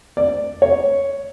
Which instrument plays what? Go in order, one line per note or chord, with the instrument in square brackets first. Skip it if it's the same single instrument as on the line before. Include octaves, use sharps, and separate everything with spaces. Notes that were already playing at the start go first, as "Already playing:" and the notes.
[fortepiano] D5
C#5